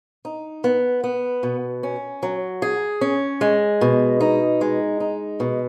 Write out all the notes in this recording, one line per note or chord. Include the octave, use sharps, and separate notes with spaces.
D#4
B3
B3
B2
C#4
F#3
G#4
C#4
G#3
B2
D#4
G#3
D#4
B2